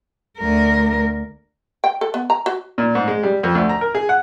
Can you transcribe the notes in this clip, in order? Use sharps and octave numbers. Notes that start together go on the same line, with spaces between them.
D2 A#4
G5
A4
B3
A#5
F#4
A#2
G#2
G#3
G3
F2
D2
A#5
A#4
G#4
F#5